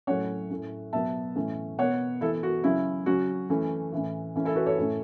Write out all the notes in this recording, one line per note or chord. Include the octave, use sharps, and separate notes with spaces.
A2 F#3 A3 C#4 C#5 F#5
A2 A3 C#4
B2 F#3 B3 E5 A5
A2 E3 A3 C#4
B2 B3 C#5 F#5
E3 B3 E4 A4
F#4
C#3 F#3 C#4 E4
C#3 F#3 C#4 F#4
E3 A3 C#4
A2 E3 C#4
E3 A3 C#4
E4 A4
F#4 B4
A4 C#5
A2 A3 C#4